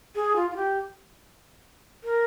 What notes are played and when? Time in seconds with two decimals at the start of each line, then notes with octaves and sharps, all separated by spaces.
0.15 G#4
0.36 F4
0.51 F4
0.56 G4
2.04 A#4